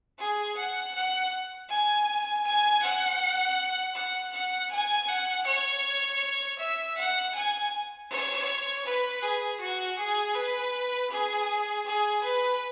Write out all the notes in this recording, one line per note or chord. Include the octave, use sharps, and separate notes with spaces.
G#4
F#5
F#5
G#5
G#5
F#5
F#5
F#5
G#5
F#5
C#5
E5
F#5
G#5
C#5
B4
G#4
F#4
G#4
B4
G#4
G#4
B4